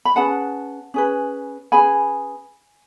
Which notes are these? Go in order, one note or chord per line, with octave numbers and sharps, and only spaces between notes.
B5
C#4 G#4 B4 F#5 A5
C#4 G#4 B4
C#4 G#4 B4 G#5 B5